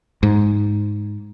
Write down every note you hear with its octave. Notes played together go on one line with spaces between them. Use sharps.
G#2